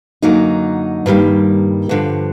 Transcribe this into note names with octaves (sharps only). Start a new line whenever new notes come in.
F#2 D3 F#3 A#3 D#4
G2 D#3 G3 A#3
G2 D3 F3